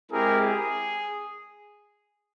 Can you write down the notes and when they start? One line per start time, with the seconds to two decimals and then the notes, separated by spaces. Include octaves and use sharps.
0.11 G#3 C4 E4 G4 G#4 A#4
0.40 G#4